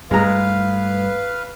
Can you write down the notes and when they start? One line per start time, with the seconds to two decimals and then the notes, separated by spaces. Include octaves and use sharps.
0.11 G2 G#3 A3 B4 F5 A#5